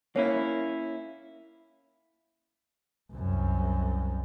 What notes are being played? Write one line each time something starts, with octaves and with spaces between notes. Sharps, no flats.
A#3 C#4 E4 C#5
C2 F#2